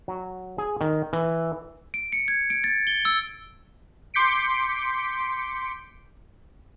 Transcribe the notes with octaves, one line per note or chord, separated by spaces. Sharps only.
F#3
G#4
D#3
E3
D7
C#7
G#6
D7
A6
G7
E6
C6 D6 G6 B6 C#7 D7